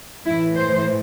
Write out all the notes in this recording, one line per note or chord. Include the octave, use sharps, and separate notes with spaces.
A2 E3 E4
C5